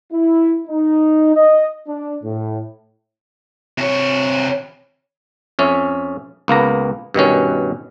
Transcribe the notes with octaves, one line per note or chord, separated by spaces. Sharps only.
E4
D#4
D#5
D4
A2
C3 C#5
F2 C#4 E5
C#2 A#3 B3 A#5
G2 B2 D#3 C#4